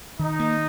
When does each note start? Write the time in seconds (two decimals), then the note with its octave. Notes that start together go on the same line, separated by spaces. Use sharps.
0.19 D#3 D#4
0.40 A#3